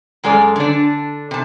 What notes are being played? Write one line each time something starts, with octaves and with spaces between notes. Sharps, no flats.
F#2 G#3 A4 D5
D3 D4
C3 A5